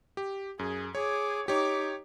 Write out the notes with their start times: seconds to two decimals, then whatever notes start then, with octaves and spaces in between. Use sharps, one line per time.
0.17 G4
0.59 F#2 G#4
0.95 G#4 C#5 D6
1.48 D#4 G4 C#5 D6